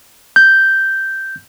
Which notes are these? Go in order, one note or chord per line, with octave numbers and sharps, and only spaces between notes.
G6